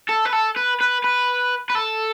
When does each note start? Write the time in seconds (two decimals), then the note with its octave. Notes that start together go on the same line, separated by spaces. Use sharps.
0.09 A4
0.26 B4
0.33 A4
0.57 B4
0.81 B4
1.04 B4
1.70 B4
1.75 A4